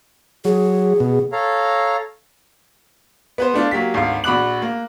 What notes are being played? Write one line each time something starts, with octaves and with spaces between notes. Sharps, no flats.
F#3 G#4
B2
A4 C#5 F5 A#5
B3 B4 C5
A3 D4 F4
F#3 A#3 G4 B6
G#1 D2 F5
A#1 F#4 B5 D6 F#6 F#7
A#3